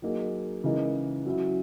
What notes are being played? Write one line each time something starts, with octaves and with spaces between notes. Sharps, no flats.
F#3 A#3 D#4 G#4
C#3 E3 G#3 D#4 A#4
F#3 C#4 E4